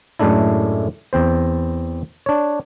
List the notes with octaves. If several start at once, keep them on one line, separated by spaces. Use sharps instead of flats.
F#2 A2 G#3 A3 D4 E4
E2 C4 C5
D4 C#5